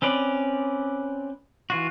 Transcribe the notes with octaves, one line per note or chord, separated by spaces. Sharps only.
C4 C#4 B4 D5
E3 F4 F#4